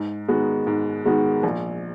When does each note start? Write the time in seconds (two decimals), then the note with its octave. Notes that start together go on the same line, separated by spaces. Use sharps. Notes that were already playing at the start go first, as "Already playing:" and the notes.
Already playing: G#2
0.28 D#3 G#3 B3 F#4
0.67 G#2
1.06 D#3 G#3 B3 F#4
1.43 A#1